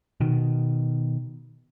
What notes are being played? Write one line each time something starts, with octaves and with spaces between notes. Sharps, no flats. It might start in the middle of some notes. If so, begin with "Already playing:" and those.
B2 D#3